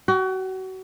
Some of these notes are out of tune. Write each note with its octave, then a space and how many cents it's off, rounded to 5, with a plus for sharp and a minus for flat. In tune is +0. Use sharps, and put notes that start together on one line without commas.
F#4 +30 G5 +0